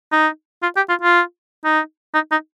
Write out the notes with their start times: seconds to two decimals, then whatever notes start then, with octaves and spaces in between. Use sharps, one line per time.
0.12 D#4
0.63 F4
0.76 G4
0.89 F4
1.02 F4
1.64 D#4
2.14 D#4
2.31 D#4